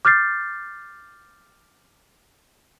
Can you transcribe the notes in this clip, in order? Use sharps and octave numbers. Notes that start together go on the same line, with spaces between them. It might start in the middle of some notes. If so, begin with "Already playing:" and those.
D6 F6 G6 A6 C7